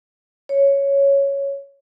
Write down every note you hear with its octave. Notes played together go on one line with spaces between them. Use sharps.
C#5